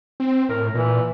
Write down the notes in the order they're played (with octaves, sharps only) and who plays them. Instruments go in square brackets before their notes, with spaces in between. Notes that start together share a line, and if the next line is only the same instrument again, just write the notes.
[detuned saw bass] C4
[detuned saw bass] A2 [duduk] A#4
[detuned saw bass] A#2 [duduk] E3